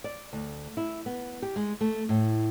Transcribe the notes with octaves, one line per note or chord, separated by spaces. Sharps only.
D5
D2
E4
B3
G4
G#3
A3
A2